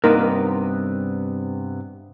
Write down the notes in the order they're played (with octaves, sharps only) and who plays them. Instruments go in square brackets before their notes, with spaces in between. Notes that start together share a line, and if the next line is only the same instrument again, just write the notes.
[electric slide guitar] G2 C3 B3 [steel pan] A#3 D#4 A#4